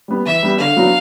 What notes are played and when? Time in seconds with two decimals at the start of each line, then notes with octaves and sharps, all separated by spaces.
0.08 G3 B3
0.26 E3 E5
0.43 G3 B3
0.59 D3 F5
0.76 F#3 B3 D4 F#4